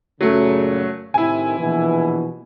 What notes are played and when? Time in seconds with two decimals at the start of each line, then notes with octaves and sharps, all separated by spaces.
0.21 F#2 A#2 C#3 F#3 A3
1.14 A2 C3 D#3 E4 G#5
1.58 A#1 B2 E3